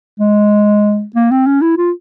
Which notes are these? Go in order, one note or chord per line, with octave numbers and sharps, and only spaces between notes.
G#3
A#3
C4
C#4
E4
F4